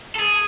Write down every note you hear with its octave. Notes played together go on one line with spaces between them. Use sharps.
A4
G#4